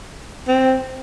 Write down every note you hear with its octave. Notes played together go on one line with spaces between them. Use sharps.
C4